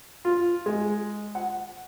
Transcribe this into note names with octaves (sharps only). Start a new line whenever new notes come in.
F4
G#3
F#5